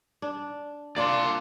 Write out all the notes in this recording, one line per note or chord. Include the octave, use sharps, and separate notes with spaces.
D4
A#3 D4 F4 D5 C6